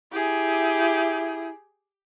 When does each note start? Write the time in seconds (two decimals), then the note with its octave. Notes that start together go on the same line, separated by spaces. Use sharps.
0.12 E4 G4 G#4